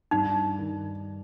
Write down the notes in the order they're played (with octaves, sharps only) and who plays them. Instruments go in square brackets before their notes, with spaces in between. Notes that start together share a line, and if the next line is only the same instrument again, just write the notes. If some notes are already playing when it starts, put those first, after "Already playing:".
[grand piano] G2 [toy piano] D#4
[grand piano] D#3